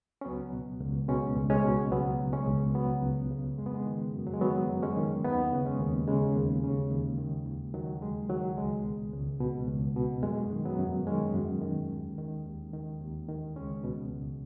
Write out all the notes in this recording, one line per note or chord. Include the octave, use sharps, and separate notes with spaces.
C#4
C#2 F#3 B3
B2
C#2
B2 G#3 C#4
C#2
G#3 C#4
B2
C#2 F#3 B3
C#3
G#3 C#4
C#2
C#3 F#3 B3
C#2
C#3
F#2 G#3
B3
G#3
D#3
F#2
F#3
G#3
D#3 F#3 B3
F#2
G#3 C#4
D#3
D#2 B3 D#4
C#3
G#3 C#4
D#2
C#3 G#3
D#2
C#3
D#2
D#3
D#2
D#3 F#3
D#2 G#3
D#3 F#3
C#2 G#3
B2
C#2
B2
C#2
B2
F#2 G#3
D#3
F#3 B3
F#2
D#3 G#3 C#4
F#2
D#3
D#2
D#3
D#2
D#3
D#2
D#3
C#2 G#3 C#4
B2
C#2